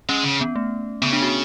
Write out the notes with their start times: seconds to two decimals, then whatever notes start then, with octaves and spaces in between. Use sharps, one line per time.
0.09 G#3 C#4
0.24 C#3
0.41 B3
0.56 A3
1.02 C#3 B3
1.13 D4
1.23 F#4